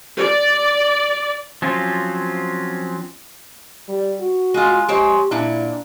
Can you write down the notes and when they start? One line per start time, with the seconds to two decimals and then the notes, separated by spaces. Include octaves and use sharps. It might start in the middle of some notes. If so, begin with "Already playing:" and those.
0.19 D5
1.62 F3 F#3 C4 C#4 F4
3.89 G3
4.21 F#4
4.54 G#3 F4
4.89 G#3 G4 C5 C#5
5.31 A#2 D4 E4